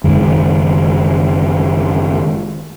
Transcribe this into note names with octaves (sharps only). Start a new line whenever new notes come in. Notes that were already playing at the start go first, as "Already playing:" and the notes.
F#1 D#3 G#3